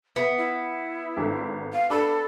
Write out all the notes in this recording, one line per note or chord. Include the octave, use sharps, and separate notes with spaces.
B3 E5
E4
G#1 D3
F5
D4 A4 B5